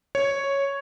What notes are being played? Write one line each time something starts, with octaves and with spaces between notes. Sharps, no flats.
C#5